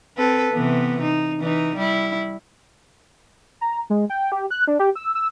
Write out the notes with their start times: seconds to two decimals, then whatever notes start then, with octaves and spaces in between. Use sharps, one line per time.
0.18 C4 A4 B4
0.53 C3 E3 B3
1.01 D#4
1.41 E3 D#4
1.76 G3 E4
3.61 A#5
3.90 G#3
4.10 G5
4.32 G4
4.51 F#6
4.68 D4
4.79 G4
4.95 E6
5.15 E6